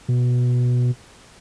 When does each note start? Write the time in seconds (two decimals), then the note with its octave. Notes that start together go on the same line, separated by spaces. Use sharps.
0.09 B2